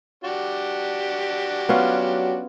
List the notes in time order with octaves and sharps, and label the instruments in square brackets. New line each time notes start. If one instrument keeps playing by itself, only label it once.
[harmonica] D4 F#4 G4
[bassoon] F#3 [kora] B3 C#4 F4